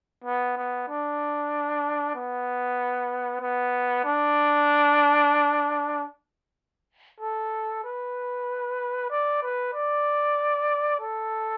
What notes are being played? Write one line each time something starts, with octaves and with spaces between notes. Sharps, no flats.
B3
B3
D4
B3
B3
D4
A4
B4
D5
B4
D5
A4